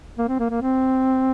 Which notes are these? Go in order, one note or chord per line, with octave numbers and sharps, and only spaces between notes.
A#3
C4
A#3
A#3
C4